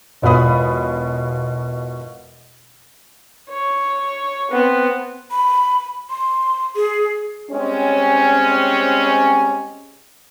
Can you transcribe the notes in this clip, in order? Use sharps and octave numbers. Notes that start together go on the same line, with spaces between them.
E1 B2 F4 B5 D#6
C#5
B3 C4
B5
C6
G#4
G3 G#3 C4 C#4